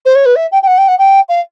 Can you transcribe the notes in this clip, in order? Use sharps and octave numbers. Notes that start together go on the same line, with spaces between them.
C5
C#5
B4
E5
G5
G5
F#5
G5
F#5
G5
F5